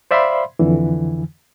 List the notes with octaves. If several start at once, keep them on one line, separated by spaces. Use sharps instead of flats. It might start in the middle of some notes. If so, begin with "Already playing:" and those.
C5 D5 E5 F5 B5 C6
F2 D3 E3